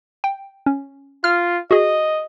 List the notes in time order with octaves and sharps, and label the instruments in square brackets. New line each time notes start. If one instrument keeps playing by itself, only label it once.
[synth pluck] G5
C#4
[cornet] F4 [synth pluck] F6
[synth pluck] F#4 G#4 [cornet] D#5